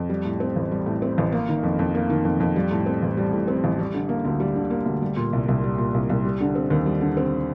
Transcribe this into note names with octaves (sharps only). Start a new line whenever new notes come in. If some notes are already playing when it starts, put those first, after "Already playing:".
Already playing: F2
G3
A2
C4
A1
G3
A2
C4
A1
A#3
D#3
F2
F2
A#3
D#3
F2
F2
G3
A2
C4
A1
G3
A2
C4
A1
G3
D3
A#3
D2
G3
D3
A#3
D2
G3
A#2
C2
C2
G3
A#2
C2
C2
G3
D3
C4
D#2
G3
D3
C4